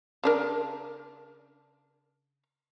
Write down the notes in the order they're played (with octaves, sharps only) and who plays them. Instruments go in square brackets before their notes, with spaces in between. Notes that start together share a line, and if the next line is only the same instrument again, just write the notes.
[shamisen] C#3 D4 A#4